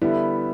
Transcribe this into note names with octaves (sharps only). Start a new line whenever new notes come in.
D3 G3 B3 E4